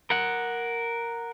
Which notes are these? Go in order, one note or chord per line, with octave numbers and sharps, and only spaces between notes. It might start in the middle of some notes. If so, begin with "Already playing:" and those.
A#4 F#5